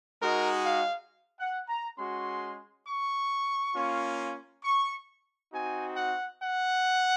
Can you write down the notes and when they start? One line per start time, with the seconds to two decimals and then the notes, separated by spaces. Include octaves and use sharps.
0.21 G#3 D#4 F#4 A#4
0.66 F5
1.40 F#5
1.68 A#5
1.98 G#3 C#4 F#4 C6
2.86 C#6
3.75 A#3 C#4 F4
4.64 C#6
5.52 C4 D#4 F#4 G#5
5.97 F#5
6.41 F#5